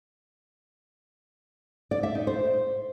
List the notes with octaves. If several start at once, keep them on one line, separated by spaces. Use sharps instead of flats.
D5
E5
D#4
C5